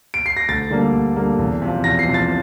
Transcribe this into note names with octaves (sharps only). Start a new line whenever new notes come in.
D7
C7
A#6
D2 A6
D3 G3 A#3
D2
D3 G3 A#3
E2
C3 F3
E2 A#6
C7
C3 F3
A6